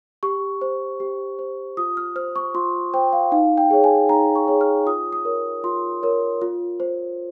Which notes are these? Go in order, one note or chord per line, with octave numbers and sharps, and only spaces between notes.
G4 C#6
C5
G4
C5
F4 D#6
F6
C5 F6
C#6
F4 C6
C5 G5
F5
D#4 F5
G5
G#4 C#5
G#5
D#4 A#5
C#6
G#4 C#5
F6
F4 D#6
D#6
A#4 C#5
F4 C6
A#4 C#5
F4
C5